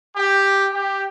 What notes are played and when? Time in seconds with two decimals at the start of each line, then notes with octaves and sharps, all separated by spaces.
0.16 G4
0.74 G4